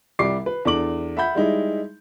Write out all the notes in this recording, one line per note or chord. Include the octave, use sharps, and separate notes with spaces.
C2 G3 D6 C7
B4
E2 D4 A4 D6 F#7
E5 F#5 B5 G6
G3 G#3 D#4 E4